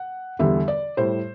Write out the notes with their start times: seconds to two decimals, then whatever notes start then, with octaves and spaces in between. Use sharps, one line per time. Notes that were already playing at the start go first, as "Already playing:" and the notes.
Already playing: F#5
0.39 E2 D3 G3 E5
0.68 D5
0.97 A2 G3 C5